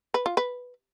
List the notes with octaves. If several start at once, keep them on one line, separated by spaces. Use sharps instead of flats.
B4
F4
B4